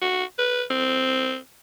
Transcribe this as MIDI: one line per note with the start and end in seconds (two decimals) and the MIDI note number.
0.02 0.24 66
0.38 0.63 71
0.70 1.37 60